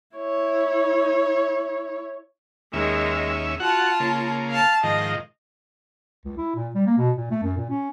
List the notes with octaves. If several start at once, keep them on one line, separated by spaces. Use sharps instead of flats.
E4 C#5
D#2 D#3 G#3 C#4 E5
F4 F#4 F#5 A5
C#3 A#3
F5 A5
G#2 D#3 F3 D#5
C#2
E4
A#2
G3
A#3
B2
A#2
A3
F#2
A#2
C#4